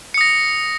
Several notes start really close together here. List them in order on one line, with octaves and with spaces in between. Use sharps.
C#7 D#6 A#6